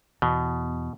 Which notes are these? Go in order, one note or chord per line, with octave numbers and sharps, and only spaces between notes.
E2 B2